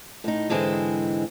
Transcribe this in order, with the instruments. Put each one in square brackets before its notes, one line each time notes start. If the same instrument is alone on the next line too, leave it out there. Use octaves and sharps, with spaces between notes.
[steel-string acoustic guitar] A2 D#4
G#2 D3 E3 G#3 C4